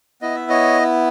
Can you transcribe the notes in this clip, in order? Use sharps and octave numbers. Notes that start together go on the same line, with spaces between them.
B3 E4 D#5
E5
C#5 D#5